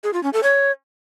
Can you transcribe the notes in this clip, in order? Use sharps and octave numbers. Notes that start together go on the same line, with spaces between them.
G#4
F4
C#4
A4
C#5